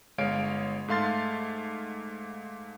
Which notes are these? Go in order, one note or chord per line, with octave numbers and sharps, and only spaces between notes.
G1 G#3 C#5 F5 D7
G#2 A3 F5 C6 A6